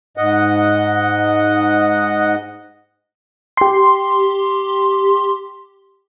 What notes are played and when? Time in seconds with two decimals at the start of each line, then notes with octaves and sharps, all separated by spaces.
0.17 G#2 D#5 F#5
3.57 G4 C6